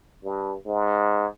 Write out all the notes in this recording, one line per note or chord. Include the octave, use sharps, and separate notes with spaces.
G2
G#2